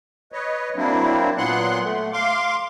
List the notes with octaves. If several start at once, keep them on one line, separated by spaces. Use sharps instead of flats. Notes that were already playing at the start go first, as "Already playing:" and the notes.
B4 C#5 D#5
F#3 A#3 C4 D4 E4
A#2 F#3 B3 F#5 C6 F#6
A3
F5 C6 D6